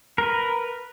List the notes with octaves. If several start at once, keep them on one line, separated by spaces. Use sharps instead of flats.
A#4 B4